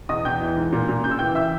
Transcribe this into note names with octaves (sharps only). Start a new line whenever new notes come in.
E2 D#5 D#6
E2 G5 G6
E3
G#2
A#2
A#2
C#3 G6
E6
E3 G5 G6
E5 E6